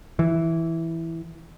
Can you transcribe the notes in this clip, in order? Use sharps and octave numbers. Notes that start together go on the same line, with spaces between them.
E3